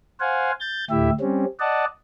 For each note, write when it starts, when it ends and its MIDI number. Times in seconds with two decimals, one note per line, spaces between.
0.20 0.52 72
0.20 0.52 77
0.20 0.52 78
0.20 0.52 80
0.60 0.85 91
0.60 0.85 93
0.90 1.10 38
0.90 1.10 45
0.90 1.10 64
0.90 1.10 67
0.90 1.10 76
1.21 1.45 55
1.21 1.45 60
1.21 1.45 61
1.60 1.85 74
1.60 1.85 75
1.60 1.85 78
1.60 1.85 81